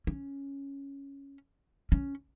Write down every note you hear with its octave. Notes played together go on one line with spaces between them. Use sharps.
C#4
C#4